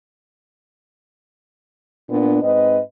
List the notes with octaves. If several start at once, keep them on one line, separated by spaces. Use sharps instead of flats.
A#2 B3 D4
G#2 C4 B4 D#5